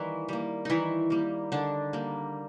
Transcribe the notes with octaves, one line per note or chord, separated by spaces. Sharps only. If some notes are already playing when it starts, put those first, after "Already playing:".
Already playing: D#3 E3 G3 A#3 E4
G3 A#3
D#3 E3 D#4 E4
G3 A#3
D3 D#3 D4
G3 A#3